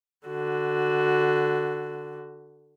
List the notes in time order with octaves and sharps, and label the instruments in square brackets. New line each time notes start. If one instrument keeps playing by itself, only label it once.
[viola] D3 F#4